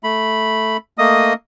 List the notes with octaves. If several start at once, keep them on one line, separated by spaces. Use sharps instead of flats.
A3 B5
A3 A#3 D#5 D#6